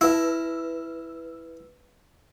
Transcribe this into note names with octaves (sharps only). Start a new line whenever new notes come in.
E4 B4 E6